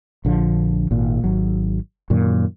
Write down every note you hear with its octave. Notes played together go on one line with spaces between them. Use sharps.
A#1 D3 F3
G#1 A#2
G#1 F#3
F#2 A#2 D#3